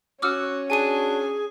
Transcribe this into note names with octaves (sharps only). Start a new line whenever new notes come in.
C#4 F#4 D6 E6 F6
D4 F#4 G#4 G#5 D#7